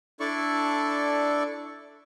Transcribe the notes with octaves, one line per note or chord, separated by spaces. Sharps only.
D4 E4 A4 D5 C#6